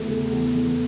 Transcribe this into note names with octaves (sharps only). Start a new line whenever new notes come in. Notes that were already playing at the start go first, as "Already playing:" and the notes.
Already playing: E2 A3
C#3
E2
E2